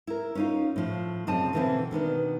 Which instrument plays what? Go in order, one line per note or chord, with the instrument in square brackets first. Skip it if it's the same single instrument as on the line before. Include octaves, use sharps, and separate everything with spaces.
[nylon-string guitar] E4 A#4
C#4 D#4 F4
A2 F3
F#2 C#3 C4 D#5 A5
B2 D3 E3 A#3 C4 E4
B2 D#3 B3 D4